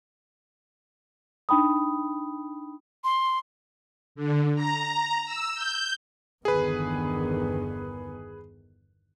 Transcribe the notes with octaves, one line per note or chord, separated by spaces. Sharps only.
D4 D#4 G5 B5 D#6
C6
D3
A#5
E6
G6
G1 E2 D3 D#3 B3 G#4 B4